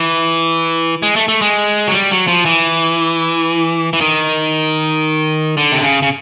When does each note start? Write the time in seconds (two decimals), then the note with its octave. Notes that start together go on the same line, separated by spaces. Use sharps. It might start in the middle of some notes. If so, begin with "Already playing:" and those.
Already playing: E3
1.03 G#3
1.16 A3
1.28 A3
1.42 G#3
1.87 F#3
1.93 G3
2.11 F#3
2.27 F3
2.45 E3
3.93 E3
4.01 D#3
5.57 D3
5.72 C3
5.83 C#3
6.02 C#3